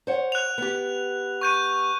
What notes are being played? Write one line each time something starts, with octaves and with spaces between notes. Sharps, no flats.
C5 C#5 F#5
F#6 F7
B3 G4
C#6 G6 D#7